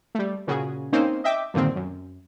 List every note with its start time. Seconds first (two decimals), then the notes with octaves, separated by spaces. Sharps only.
0.15 G3 A3
0.47 A#2 C#3 C#4 F#4 G#4
0.93 A#3 C4 C#4 D#4 C5
1.24 D#5 E5 G5 D6
1.54 G2 A#2 D3 D#3 C4
1.76 F#2